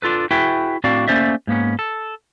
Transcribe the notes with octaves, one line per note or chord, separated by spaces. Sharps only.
D4 F4 A4 B4
E4 F#4 G#4 B4 E5 G5
A2 C4 D4 F#4 D5 F5
A3 A#3 C#4 C5 D5 E5
G#2 A#3 B3 C#4
A4